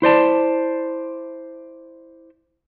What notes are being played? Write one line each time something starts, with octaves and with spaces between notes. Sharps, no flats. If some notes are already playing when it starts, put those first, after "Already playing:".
E4 C5 D5 A5